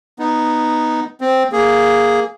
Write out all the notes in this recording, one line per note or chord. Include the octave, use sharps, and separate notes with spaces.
B3 D#4
C4
A#3 G#4